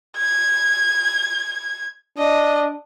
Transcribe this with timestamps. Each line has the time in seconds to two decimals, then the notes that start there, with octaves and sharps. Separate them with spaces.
0.17 G#6
2.18 D4 D#5